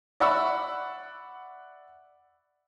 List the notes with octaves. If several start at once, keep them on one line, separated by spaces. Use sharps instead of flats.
D5 E5 F#5 B5 C#6 E6